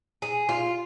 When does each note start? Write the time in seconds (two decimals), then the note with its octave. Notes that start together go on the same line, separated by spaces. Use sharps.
0.22 G#4
0.49 F4